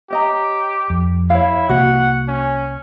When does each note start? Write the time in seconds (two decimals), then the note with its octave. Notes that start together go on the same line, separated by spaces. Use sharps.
0.11 G4 C#5 D#5 A#5
0.90 F2
1.30 E4 C#5 F5
1.69 C2 C3 A#3 F#4 F#5
2.28 C#4